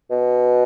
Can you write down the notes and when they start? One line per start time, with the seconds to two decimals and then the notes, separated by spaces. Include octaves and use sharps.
0.11 B2